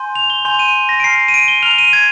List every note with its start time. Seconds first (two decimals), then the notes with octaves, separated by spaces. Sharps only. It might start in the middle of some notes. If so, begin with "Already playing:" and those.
Already playing: G#5 C6 G6
0.15 F7
0.30 G7
0.45 G#5 C6 G6 F7
0.59 D#7
0.89 A#6
1.00 D7
1.04 A#5 F6 C7
1.28 D#7
1.34 D7
1.48 G7
1.62 F6 F7
1.66 A#5
1.78 D#7
1.93 G#6